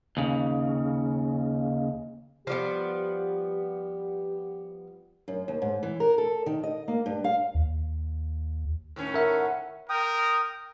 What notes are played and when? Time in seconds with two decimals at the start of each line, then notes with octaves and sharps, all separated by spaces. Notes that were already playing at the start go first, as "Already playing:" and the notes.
0.17 D#2 C#3
2.47 F3 G3 B3 G4
5.28 F#2
5.48 D#2
5.62 G#2
5.83 E3
6.00 A#4
6.18 A4
6.46 D#3
6.63 D#5
6.88 A#3
7.06 G2
7.24 F5
7.54 D#2
8.96 A2 D#3 C#4
9.14 A#4 E5 F#5
9.89 A#4 G5 D#6